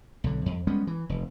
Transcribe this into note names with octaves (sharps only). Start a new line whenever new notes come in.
B1 D3
F2
G3 G#3 B3 C#4
E3
F1